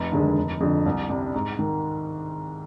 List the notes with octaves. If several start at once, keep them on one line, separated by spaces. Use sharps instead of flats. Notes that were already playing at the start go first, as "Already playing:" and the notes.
Already playing: F1
D#2 D3 G#3
F1
F2 D3
C2
C3 G3
G#2
D#3